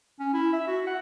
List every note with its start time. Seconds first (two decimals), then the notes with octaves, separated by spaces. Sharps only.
0.20 C#4
0.34 E4
0.53 E5
0.67 F#4
0.87 F#5